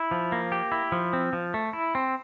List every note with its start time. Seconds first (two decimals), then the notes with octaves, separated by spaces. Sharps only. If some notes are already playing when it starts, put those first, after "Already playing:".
Already playing: E4
0.11 F3
0.32 A#3
0.52 G4
0.72 E4
0.92 F3
1.13 C4
1.33 F3
1.54 A3
1.73 E4
1.95 C4